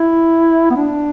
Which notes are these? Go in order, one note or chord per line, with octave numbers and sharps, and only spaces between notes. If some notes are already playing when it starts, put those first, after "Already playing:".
Already playing: E4
B3
D4